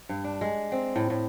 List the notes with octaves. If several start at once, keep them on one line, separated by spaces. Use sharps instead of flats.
G2
D4
G#3
C4
A2
A2